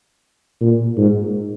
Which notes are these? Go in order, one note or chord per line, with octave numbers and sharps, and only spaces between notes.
A#2
G#2